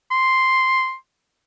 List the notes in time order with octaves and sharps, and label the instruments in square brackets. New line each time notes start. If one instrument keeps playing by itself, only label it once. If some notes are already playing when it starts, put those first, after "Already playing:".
[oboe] C6